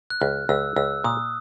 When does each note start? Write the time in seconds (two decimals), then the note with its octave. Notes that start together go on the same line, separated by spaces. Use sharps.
0.10 F#6
0.21 C#2 F6
0.49 C#2 E6
0.76 C#2 E6
1.04 A#2 D#6